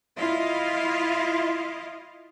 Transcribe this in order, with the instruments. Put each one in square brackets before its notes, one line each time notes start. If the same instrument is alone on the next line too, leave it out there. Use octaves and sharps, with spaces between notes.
[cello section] E4 F4 D#5 F5